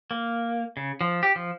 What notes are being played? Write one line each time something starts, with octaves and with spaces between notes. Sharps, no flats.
A#3
C#3
F3
G4
F3